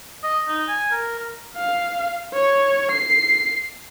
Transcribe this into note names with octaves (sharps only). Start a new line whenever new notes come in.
D#5
D#4
G#5
A#4
A#4
F5
C#5
C7